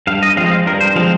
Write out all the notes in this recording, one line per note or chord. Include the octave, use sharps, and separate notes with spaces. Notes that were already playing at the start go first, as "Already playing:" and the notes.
G2 F5
D#5
F3 G#3 C4 F5
D#5
F5
G2 A#4
C5
F3 G#3 C4 F5